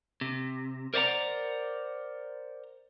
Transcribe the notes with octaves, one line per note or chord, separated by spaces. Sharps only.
C3
A#4 C5 D5 D#5 F#5 A#5